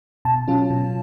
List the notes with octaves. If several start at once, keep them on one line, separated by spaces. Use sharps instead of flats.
B2 A5
F#3 C#4 F4
B2